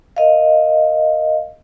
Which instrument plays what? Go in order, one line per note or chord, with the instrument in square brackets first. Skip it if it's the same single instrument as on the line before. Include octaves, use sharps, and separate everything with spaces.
[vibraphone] A#4 D#5 F5